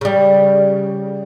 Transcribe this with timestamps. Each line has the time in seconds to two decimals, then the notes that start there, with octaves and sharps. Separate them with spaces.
0.01 C#3 G3